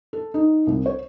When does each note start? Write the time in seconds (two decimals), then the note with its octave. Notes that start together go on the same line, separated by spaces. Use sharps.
0.13 A4
0.34 D#4
0.67 C2
0.86 C#5